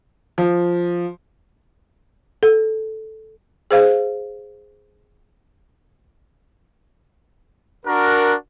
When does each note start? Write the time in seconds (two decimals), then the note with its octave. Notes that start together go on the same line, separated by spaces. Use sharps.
0.38 F3
2.43 A4
3.71 G#4 C5 F5
7.85 D4 F#4 A#4